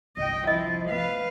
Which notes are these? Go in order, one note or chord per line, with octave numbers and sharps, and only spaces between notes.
G1 C2 D#5 G5
F3 E4 D#5
A3 B3 B4 F5